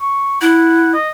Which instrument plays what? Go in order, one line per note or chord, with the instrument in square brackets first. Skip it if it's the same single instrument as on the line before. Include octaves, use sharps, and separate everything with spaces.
[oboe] C#6
[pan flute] E4 [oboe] F#5
[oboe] D#5